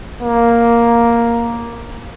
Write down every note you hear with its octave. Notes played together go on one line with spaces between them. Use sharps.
A#3